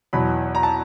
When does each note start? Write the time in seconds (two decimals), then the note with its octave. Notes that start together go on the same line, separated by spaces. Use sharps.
0.13 E2 B2 F#3 B5
0.55 A#5
0.63 A5